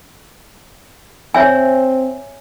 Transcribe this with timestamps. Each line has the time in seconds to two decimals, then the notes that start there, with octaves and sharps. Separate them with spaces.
1.34 C4 C#5 E5 G#5